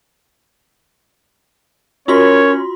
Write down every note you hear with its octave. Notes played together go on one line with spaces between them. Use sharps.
C#4 F4 F#4 A#4 C#5 C6